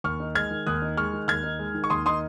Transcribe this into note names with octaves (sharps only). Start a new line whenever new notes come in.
D#2 C#6 F6
D#4
G#3 F6 G#6
D#3
D#2 D#6 F#6
D#4
G#3 C#6 F6
D#3
D#2 F6 G#6
D#4
G#3
D#3
C#6
D#2 C6 D#6
D#4 C6 D#6